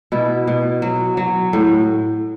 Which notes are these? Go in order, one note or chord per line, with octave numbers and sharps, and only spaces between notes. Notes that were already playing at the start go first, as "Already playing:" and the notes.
B2 E4
B2
F#3
F#3
A2